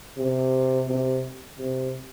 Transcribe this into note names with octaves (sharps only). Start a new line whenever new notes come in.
C3
C3
C3